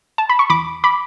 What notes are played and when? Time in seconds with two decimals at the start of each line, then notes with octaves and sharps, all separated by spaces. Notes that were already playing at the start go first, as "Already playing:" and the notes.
0.18 A5
0.29 B5
0.39 C#6
0.50 E2 B5 D6
0.84 B5 D6